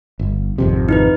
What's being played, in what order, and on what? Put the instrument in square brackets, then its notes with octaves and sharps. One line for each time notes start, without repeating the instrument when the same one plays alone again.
[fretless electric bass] G1
G#1 F2 C3
[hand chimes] D#4 E4 B4